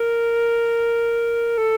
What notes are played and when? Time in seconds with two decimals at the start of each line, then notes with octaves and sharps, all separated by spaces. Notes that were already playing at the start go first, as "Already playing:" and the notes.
Already playing: A#4
1.58 A4